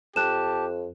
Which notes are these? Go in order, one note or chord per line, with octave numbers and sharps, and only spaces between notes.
F2 G4 A5 F#6 E7